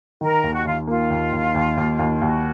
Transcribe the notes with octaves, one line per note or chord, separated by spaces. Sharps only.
D#3 A#4
D#2
F#4
D#2 F4
A#3 F4
D#2
D#2
D#2
D#2
D#2
D#2 F#4